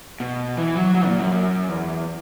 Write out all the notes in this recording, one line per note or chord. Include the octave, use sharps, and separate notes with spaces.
B2
E3
F#3
F#3
A#2
F#2
F#2
E2